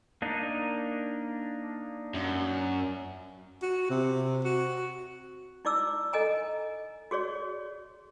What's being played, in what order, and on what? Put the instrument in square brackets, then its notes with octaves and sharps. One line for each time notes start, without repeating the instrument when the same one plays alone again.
[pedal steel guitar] A#3 D4 D#4
[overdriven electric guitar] F#2
[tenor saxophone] F#4
C3
F#4
[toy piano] D#4 E4 D5 D6 E6
A4 D#5 G#5 A#5
F#4 G#4 C#5 D5